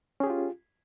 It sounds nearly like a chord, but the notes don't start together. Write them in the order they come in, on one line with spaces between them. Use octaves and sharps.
C#4 G#4 G4 F4